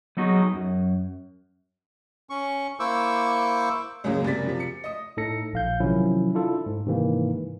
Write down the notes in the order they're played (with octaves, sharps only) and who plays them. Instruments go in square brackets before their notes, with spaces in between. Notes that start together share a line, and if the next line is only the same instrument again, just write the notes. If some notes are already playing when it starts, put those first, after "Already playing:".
[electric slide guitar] F#3 B3 D#4 F#4 G#4
F#2
[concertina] C#4 C#6
A#3 E4 C5 C#6 D6 E6
[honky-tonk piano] C#2 F#2 A2 C#3 G#3 A#3
F#1 C3 D5 A6 B6
C3 F3
C#7
D#5 D#6
[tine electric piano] A2 D#4 A4 A#6 C#7
A#1 F5 G6
C3 D#3 F3 F#3 C#4 E4
D4 E4 F4 A4
G#2
G#2 C3 D#3 E3 A#3